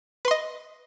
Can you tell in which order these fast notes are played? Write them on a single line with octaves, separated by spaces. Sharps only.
B4 C6 D#5